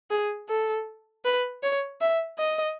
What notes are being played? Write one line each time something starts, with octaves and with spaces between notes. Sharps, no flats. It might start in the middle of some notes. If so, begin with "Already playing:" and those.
G#4
A4
B4
C#5
E5
D#5